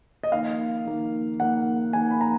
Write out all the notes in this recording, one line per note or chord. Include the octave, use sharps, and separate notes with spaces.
D#5
D#3 A#3 F5
D#3 A#3
D#3 A#3 F#5
D#3 A#3 G#5
B5
A#5